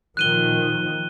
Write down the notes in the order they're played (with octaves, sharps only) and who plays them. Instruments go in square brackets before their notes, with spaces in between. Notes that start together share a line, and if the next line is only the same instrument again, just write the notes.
[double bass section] A#2 D#3 F3 [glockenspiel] F#6 D#7 G7